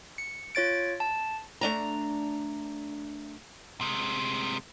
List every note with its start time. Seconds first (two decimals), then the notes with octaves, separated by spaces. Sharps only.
0.18 C#7
0.55 F4 C#5 A6 D7
1.00 A5
1.61 A3 D4 A#5
3.81 C3 G#3